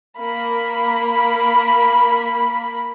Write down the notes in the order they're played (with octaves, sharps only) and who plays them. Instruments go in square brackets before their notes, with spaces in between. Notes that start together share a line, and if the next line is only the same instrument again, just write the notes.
[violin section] A#3 B5